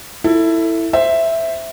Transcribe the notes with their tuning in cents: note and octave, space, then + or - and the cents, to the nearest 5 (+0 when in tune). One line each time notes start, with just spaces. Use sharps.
E4 +0 A4 +20
C5 +0 E5 +0